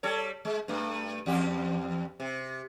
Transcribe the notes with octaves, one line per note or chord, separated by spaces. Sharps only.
G3 A4 C#5
G#3
G2 A3
E2 G4
C3